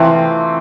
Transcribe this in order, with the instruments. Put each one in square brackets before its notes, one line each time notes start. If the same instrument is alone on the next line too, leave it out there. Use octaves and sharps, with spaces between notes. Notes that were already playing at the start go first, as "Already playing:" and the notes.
Already playing: [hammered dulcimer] C3 F3 A3 C4 [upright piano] E3